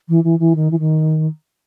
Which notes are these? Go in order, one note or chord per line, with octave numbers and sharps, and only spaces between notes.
E3
E3
E3
D#3
E3
D#3